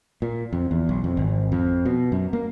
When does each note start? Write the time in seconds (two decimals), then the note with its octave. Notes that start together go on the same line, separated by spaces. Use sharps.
0.22 A#2
0.53 F2
0.71 E2
0.89 B1
1.04 F2
1.17 G#1
1.52 F2
1.85 B2
2.12 F#2
2.33 A#3